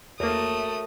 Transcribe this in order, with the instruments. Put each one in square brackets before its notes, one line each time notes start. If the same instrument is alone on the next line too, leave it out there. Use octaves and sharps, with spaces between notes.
[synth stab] E2 A#3 [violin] A3 D#6 [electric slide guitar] F#4 A#4 C#5